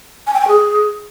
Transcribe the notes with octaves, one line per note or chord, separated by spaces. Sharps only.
G#5
G5
G#5
G#4